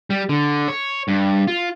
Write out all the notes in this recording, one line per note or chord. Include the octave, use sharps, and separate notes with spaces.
G3
D3
C#5
G2
F4